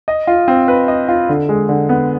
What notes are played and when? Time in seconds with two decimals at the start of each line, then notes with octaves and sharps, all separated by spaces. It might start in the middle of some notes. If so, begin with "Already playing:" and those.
0.08 D#5
0.27 F4
0.48 C4
0.68 B4
0.88 D#5
1.09 F4
1.29 D3
1.49 G#3
1.69 D3
1.89 B3